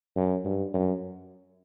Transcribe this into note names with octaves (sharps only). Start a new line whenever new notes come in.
F#2
G2
F#2